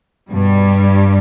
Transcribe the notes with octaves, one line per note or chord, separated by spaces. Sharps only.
G2 B2 G3